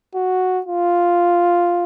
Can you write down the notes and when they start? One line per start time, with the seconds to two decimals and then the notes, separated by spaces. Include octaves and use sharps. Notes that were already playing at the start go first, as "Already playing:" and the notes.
0.15 F#4
0.67 F4